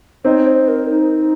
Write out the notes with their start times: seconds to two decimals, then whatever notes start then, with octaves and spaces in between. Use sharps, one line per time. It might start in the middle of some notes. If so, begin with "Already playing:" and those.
0.25 C4 D#4 C#5
0.47 C5
0.68 A#4
0.89 D#4